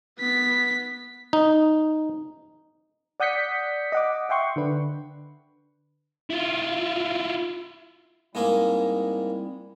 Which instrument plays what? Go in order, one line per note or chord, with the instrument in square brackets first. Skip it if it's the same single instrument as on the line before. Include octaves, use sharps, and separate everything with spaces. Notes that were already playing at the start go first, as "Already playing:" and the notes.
[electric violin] B3 B6
[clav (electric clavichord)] D#4
[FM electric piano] D5 F#5 D#6 G6 B6 C#7
D#5 F#5 D6
E5 F#5 G5 C6 C#6
D3 D4 B4
[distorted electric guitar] E4 F4
[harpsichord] G#2 G#3 A#3 [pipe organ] G3 C4 E4